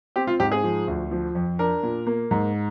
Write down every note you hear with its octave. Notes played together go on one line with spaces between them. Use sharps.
C4 G4
F4
G#2 G4
G#4
F3
D2
F3
F2
D4 A#4
A#2
A#3
G#2